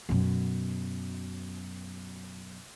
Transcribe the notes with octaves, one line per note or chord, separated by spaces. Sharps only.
F#2 B2